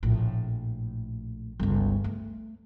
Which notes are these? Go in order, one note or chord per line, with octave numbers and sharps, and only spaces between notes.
A#1 A2
G1 C#2
A3